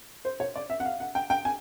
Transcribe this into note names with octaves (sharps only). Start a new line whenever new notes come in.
C5
C#5
D5
E5
F#5
F5
F#5
G5
G5
G#5